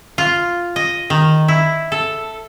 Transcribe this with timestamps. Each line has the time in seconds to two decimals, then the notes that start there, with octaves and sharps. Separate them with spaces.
0.18 F4
0.76 D#5
1.10 D#3
1.48 E4
1.92 A4